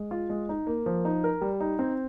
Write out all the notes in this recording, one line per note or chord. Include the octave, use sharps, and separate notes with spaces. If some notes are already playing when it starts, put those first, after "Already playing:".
Already playing: G#3
F4
G#3
D#4
A#3
F3
D#4
A#4
G3
D#4
C4